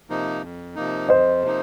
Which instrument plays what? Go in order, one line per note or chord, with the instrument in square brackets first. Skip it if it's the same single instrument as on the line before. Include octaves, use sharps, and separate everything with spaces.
[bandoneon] C3 F3 A#3 D#4
F2
C3 F3 A#3 D#4
[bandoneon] F2 [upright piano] C5 D#5
[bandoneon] C3 F3 A#3 D#4